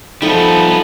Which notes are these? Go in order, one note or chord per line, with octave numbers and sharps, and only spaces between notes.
F3 G3 A3 B3 D#4